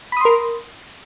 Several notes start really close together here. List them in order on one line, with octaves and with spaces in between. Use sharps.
B5 D#6 C6 A#4